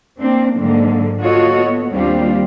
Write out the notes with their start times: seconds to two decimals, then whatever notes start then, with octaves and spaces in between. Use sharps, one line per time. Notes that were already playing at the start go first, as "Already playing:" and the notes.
0.21 A#3 C4 D4
0.58 G#2 D3 F#3 A#3
1.21 F4 F#4 A4 C#5 D#5
1.62 B3
1.92 D#2 G3 C4 D4 F4 G4